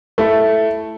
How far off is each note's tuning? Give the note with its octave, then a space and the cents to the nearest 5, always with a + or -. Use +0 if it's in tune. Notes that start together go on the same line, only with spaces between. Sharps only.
A3 +0 E4 +5